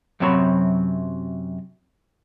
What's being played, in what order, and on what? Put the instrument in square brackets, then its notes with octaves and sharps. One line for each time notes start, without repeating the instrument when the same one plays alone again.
[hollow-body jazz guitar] F#2 C3 F#3 C4 C#5 B5